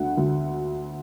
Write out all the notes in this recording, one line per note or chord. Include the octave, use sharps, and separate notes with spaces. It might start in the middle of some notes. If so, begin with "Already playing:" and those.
Already playing: D2 D3 F#5
D2